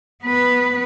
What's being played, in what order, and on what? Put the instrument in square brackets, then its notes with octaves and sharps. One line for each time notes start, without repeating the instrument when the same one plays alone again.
[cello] B3 B4